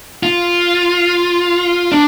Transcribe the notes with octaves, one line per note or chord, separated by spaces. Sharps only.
F4
D4